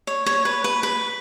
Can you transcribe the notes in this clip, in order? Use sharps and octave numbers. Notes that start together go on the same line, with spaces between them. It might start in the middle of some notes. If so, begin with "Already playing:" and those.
C#5
C#5
B4
B4
B4